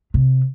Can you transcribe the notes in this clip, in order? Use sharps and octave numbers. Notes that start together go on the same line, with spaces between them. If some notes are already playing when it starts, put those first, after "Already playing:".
C3